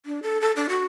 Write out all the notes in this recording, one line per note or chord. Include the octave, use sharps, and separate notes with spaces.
D4
A4
A4
D4
F#4